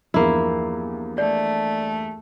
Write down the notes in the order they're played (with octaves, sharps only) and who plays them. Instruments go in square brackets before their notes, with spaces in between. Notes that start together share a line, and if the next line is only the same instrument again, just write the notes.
[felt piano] E2 G2 F3 [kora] A#3 E4
[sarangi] A3 [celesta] D5